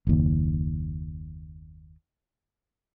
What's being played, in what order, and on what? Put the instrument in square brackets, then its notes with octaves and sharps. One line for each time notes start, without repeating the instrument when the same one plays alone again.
[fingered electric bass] F#1 D#2